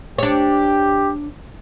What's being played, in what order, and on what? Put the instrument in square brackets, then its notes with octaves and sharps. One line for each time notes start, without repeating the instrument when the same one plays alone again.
[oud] D4 C#5 [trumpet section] G4